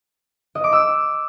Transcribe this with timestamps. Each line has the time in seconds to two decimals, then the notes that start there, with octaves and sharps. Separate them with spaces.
0.55 D#5
0.64 D6
0.72 E6